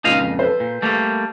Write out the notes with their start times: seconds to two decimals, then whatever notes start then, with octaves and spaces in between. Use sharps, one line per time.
0.04 C#2 A#2 D#4 D#5 F5
0.20 F2
0.39 A4 B4 C5
0.60 A#2
0.82 G3 A3 A#3